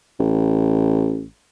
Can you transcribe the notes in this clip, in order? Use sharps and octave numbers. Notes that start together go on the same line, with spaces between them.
A1